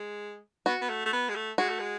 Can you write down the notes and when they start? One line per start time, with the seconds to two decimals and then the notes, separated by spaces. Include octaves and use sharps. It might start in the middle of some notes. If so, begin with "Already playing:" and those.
Already playing: G#3
0.66 B3 F#4
0.81 B3
0.89 A3
1.06 A3
1.13 B3
1.29 G#3
1.35 A3
1.58 G#3 F#4
1.69 A3
1.79 G#3